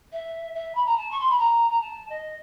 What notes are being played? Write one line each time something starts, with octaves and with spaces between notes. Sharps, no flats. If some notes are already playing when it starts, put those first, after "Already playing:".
E5
E5
B5
A#5
A5
C#6
C6
B5
A#5
A#5
A5
D#5